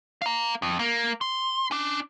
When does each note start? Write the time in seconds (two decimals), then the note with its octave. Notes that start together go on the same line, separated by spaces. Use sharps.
0.22 F5 A#5
0.62 F2
0.79 A#3
1.21 C6
1.71 C#4 D4